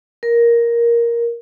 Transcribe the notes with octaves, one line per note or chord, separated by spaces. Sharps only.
A#4